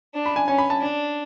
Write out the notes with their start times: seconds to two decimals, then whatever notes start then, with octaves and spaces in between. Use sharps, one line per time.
0.14 D4
0.26 B5
0.36 G#5
0.47 C#4 G#5
0.58 B5
0.70 A5
0.81 D4